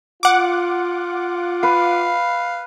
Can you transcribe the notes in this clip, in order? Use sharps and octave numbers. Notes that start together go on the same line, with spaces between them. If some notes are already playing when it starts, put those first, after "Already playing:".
F4 F#5 D6
B4 F5